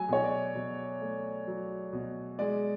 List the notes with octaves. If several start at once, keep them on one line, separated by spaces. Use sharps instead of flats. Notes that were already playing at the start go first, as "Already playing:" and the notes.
Already playing: F#3 A3 G#5
B2 C#5
D5
B2
A3
F#3
B2
G#3 D5